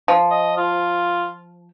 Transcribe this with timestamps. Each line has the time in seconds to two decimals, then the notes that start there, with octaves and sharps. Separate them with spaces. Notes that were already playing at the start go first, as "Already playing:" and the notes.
0.08 F3
0.31 D#5
0.57 F4